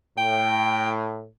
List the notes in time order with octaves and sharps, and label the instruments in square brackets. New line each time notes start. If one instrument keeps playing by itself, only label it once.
[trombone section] A2 [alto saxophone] G5